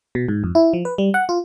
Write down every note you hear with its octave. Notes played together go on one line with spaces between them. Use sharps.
B2
G#2
F2
E4
F3
B4
G3
F#5
F4